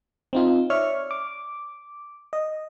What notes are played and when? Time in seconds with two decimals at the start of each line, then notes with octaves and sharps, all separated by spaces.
0.33 C4 D#4 F4
0.70 C#5 D5 E5 C#6 F6
1.11 D6
2.33 D#5